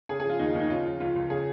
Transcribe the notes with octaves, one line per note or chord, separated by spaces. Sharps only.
C#3 G#4
G#4
F3 F4
D#2 D#4
D#2
D#4
C#3 F4
F3
C#2 F4
C#2
C#3 G#4